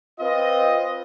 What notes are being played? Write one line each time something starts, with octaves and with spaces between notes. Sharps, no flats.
C4 F4 B4 C5 D#5